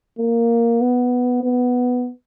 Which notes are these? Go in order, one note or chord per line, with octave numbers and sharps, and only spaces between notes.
A#3
B3
B3